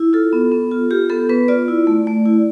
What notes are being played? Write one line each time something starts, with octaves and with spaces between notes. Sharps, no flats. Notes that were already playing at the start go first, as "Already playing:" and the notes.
Already playing: E4
F4 A4
B3
B3
F4
F4 G4
B3 A4
B3 B4
F4 D5
E4
A3
A3
E4